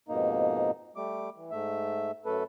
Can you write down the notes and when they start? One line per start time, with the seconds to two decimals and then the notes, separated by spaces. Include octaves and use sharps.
0.09 F2 G#2 B2 A#3 D#4
0.96 G3 A3 D6
1.36 E3
1.51 G#2 A3 E5
2.25 F#2 A3 A4 B4